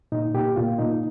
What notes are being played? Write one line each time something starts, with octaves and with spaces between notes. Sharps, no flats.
A#2 D#4
A#2 G4
A#2 F4
A#2 D#4